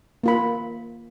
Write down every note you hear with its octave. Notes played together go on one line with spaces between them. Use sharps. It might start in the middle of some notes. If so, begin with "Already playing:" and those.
A#3 F4 B5